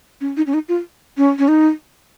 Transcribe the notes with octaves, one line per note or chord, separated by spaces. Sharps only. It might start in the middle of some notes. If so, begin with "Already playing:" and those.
C#4
D#4
C#4
D#4
F4
C#4
C#4
D#4